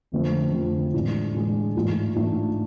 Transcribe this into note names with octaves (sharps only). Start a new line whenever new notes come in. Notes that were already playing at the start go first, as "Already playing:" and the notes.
F2 D3 F3 A3 C4
F2 D3 F3 A3 C4
A2 E3 G#3 D4
A2 E3 G#3 D4
G#2 E3 A3 D4 F4
G#2 E3 A3 D4 F4